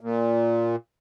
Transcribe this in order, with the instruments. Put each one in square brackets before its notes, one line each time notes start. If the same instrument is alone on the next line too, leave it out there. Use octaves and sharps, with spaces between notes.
[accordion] A#2